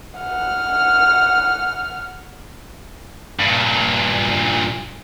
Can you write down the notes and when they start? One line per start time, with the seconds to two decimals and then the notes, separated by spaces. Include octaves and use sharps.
0.19 F#5 F6
3.40 G2 A#2